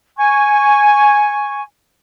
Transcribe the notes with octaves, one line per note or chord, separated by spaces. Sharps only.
G#5 C#6